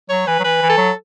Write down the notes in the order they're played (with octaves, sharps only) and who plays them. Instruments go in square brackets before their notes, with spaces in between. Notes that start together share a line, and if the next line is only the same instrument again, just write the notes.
[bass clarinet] F#3 [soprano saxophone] C#5
[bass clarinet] E3 [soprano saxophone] B4
[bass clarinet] F#3
[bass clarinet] E3 [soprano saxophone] B4
[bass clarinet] E3
[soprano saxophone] A4
[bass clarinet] F#3